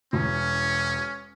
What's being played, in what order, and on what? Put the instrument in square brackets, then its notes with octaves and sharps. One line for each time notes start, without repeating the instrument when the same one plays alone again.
[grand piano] E1 [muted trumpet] C#4